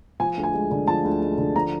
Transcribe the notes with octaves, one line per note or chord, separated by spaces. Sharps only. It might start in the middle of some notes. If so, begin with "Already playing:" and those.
F3 G#5
D2
G#5
G#3
D3
F3 A5
D2
G#3
D3
F3 A#5